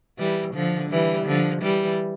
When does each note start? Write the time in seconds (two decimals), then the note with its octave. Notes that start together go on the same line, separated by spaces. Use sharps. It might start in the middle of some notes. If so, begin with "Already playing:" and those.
0.19 E3 G3
0.54 D3 F3
0.90 E3 G3
1.27 D3 F3
1.62 E3 G3